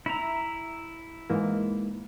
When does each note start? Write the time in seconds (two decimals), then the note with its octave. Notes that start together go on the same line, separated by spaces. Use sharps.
0.06 E4 E5 A#5
1.30 G#2 E3 A#3